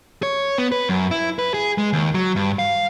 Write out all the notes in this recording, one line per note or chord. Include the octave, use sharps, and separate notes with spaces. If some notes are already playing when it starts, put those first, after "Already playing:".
C#5
B3
B4
F#2
E4
B4
G#4
G#3
D#2
F#3
G2
F5